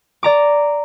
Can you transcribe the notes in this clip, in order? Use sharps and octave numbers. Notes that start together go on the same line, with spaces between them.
D5 A#5 D6